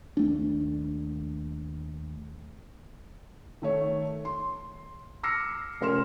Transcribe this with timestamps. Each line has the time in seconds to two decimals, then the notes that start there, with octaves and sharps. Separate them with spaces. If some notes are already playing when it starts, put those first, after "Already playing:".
0.17 D#2 A3 D4
3.62 D#3 A3 C#5
4.25 C6
5.23 D6 E6 F6 A#6 C7 C#7
5.81 F1 C#4 A#4 C6 F6 E7